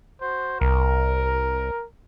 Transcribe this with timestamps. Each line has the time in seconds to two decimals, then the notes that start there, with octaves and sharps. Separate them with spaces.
0.21 F#4 C5
0.61 C2 A#4